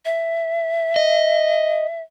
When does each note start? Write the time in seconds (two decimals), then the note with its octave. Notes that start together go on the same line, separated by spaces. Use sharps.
0.05 E5
0.96 D#5